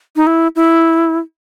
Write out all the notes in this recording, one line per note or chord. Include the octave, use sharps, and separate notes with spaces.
D#4
E4
E4